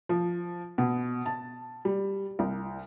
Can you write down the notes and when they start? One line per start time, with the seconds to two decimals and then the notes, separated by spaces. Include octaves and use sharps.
0.09 F3
0.78 B2
1.26 A5
1.85 G3
2.39 C2